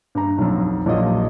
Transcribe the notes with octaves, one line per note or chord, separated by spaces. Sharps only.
G2 A#5
B1 F2
A#1 A#2 F#3 F4 D#5